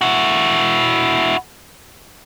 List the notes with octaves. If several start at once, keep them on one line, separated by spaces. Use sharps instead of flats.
E4 F#4